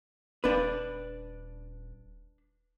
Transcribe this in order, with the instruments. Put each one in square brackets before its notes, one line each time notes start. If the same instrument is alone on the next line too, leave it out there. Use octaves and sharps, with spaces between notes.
[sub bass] D#1 [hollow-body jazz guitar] D4 B4